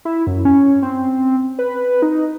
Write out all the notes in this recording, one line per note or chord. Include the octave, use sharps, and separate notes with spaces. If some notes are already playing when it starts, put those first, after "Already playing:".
E4
F#2
C#4
C4
B4
D#4